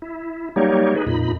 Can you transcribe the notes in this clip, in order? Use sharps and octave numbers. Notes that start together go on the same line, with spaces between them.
E4
F#3 G3 A#3 D#4 G4 C#5
D#4 G#4 B4
F2 A#2 D#4 B5